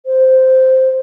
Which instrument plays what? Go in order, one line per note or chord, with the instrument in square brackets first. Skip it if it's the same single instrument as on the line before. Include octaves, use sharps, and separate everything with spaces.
[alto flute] C5